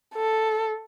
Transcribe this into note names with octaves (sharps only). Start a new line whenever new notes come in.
A4